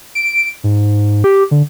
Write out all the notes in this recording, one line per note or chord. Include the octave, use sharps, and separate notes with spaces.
D7
G#2
G4
D3